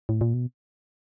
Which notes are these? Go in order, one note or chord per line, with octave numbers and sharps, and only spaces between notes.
A2
A#2
B2